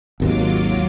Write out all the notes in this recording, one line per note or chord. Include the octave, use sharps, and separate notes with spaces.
G#1 D#2 G#2 F#3 F4 D6